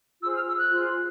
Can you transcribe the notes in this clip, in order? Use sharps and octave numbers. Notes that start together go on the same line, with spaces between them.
F4 G#4 C5 E6
F6
E6
F#6
F4 G#4 C5